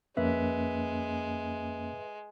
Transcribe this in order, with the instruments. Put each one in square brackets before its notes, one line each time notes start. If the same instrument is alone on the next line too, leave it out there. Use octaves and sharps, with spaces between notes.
[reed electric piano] F2 A#3 C#4 [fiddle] G#3 [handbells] B4 E5